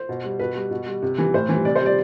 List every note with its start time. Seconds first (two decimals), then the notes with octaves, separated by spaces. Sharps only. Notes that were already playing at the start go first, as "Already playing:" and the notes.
Already playing: C5
0.09 B2
0.24 G3
0.39 B2 B4
0.55 G3
0.71 B2
0.86 G3
1.02 C3
1.18 E3 G3
1.34 A2 C5
1.49 E3 G3
1.65 C3 D5
1.75 C5
1.81 G3 D5